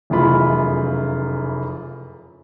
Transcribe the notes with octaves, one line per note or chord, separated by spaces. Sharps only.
F1 F#2 C#3 E3 F4 B5